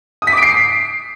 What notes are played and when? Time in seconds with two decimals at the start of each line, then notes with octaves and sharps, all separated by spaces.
0.22 D#6
0.27 B6
0.32 D6
0.37 D7
0.42 C7